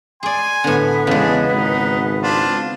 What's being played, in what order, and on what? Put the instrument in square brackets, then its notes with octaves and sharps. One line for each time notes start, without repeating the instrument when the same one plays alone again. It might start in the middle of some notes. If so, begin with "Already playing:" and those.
[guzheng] G#4 D5 [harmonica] G#5 C6
[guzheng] A2 D3 [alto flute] B3
[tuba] E2 [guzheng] C#3 G#3 [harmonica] D4 G#4
[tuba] G#1 [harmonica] D#4
[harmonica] D4 F4 C5